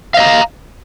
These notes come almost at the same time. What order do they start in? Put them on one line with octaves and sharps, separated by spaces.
F5 D#5 A#5